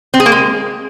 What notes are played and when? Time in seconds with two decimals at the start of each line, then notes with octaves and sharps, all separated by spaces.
0.14 C4
0.20 G#4
0.26 A#3
0.32 G#3